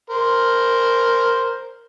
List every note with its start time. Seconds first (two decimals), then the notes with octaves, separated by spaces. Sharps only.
0.10 A#4 C5